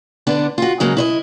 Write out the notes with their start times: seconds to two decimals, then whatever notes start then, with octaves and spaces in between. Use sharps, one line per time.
0.27 D3 B3 D4
0.58 F4 F#4
0.80 C#3 F#3 G#3 A#3
0.97 E4 C5 D#5